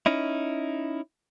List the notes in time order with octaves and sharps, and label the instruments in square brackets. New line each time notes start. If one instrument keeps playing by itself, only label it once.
[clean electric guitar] C#4 D#4 E4